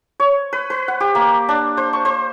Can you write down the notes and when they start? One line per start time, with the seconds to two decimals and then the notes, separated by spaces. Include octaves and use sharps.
0.20 C#5
0.53 B4
0.70 B4
0.88 F#5
1.00 G4
1.15 A#3
1.49 D4
1.77 C5
1.93 C#6
2.05 C5